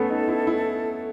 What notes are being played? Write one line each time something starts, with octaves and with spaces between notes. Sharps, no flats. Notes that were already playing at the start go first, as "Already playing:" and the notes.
Already playing: A3 B3 C#4 A4
D#4
E4
E4